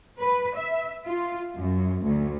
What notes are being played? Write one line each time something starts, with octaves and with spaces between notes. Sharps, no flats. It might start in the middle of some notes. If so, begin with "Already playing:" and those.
B4
E5
F4
F#2
D2